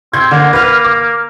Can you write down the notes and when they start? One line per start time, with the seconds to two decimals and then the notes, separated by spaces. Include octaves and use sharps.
0.14 C4 G6 G#6
0.31 D3 A#3
0.53 B4 F6
0.85 D6